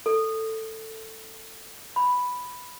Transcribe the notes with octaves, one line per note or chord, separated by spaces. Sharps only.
A4
B5